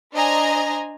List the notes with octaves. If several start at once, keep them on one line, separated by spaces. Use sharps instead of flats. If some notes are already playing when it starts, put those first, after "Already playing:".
D4 C5 D#5 G#5 A#5 A#6